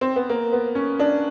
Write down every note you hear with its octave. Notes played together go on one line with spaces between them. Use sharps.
C4
B3
A#3
B3
C#4
D4